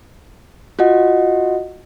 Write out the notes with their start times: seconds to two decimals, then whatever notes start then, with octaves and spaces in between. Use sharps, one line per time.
0.79 F4 F#4 D#5 F#5